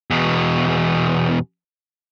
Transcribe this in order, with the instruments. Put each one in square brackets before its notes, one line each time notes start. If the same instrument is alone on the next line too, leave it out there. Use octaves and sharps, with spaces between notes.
[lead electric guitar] E2 B2